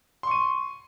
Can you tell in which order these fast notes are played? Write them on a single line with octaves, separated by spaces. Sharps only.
C6 C#6 D#7